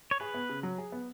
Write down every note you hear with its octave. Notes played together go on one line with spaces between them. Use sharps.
C#5
G#4 B4
B3
C#3
F#3
G#4
B3